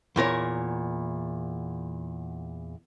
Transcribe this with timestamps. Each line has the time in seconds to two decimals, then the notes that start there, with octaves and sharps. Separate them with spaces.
0.16 E2 A#2 A#4 C#5